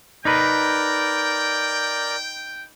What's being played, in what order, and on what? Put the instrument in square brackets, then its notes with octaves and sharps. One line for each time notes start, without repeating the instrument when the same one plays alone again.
[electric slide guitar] D#4 B4 [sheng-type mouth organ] A#4 D5 [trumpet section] G5